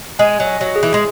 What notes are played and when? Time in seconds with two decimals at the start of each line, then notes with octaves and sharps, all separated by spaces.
0.19 G#3 G#5
0.40 F#3
0.47 D#5
0.61 F#3
0.76 G#4
0.83 E3
0.94 G#3